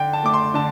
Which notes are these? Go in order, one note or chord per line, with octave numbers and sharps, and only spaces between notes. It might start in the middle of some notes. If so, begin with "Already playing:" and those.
Already playing: D3 G5
A5
A3 D6
C6
D3 A5